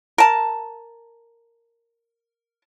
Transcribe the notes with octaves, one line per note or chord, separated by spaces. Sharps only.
A#4 A5